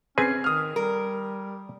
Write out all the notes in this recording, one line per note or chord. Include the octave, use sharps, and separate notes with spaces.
C4 C#4 G#4 B4 G#6 C7
D#3 D#6 F6
G3 A#4